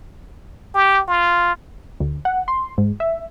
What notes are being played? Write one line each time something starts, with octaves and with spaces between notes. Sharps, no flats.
G4
F4
D2
F#5
C6
G#2
E5